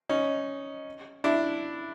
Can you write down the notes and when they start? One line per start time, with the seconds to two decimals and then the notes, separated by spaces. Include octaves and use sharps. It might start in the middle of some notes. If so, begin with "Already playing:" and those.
0.09 C#4 D#4
1.24 D4 E4